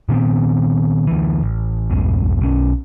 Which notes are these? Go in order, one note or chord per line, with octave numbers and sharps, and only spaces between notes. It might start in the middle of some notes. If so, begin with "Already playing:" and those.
A#2 D#3 B3 C4
D2 E3
A1
A#1 E2 G2 G#3
B1 C#4